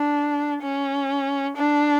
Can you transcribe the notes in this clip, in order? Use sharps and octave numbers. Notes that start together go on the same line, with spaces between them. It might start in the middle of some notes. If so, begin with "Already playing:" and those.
Already playing: D4
C#4
D4